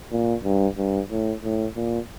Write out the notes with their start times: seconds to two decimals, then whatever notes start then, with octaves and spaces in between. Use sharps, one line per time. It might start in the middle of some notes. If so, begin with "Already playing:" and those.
0.12 A#2
0.45 G2
0.78 G2
1.11 A2
1.44 A2
1.76 A#2